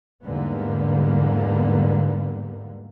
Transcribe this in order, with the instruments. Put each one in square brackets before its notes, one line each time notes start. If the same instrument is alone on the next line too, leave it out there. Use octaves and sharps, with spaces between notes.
[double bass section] E2 G#2 D3 G3 A#3 B3